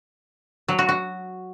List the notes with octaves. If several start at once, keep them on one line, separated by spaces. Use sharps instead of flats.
F#3
F#4
F#4